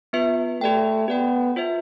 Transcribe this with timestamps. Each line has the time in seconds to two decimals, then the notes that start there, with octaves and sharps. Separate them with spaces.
0.13 B3 F4 B4 E5
0.61 A3 G4 D5 G5
1.08 B3 G4 D5 G5
1.56 F4 C5 E5